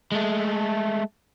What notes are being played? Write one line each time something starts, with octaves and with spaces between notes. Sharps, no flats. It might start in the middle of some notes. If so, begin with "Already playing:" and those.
G#3 A3